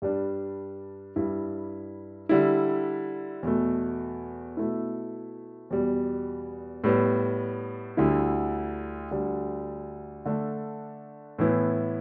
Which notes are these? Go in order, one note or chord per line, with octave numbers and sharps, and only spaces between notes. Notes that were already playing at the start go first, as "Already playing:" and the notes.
G2 G3 D4
G2 G3 E4
D3 G3 E4
E2 B2 A3
B2 A3 E4
E2 B2 G3
A2 G3 B3
D2 D3 G3 E4
D2 D3 G3 D4
D3 A3 D4
A2 E3 B3 E4